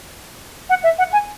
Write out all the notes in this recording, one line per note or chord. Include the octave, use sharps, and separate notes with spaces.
F#5
E5
F#5
G#5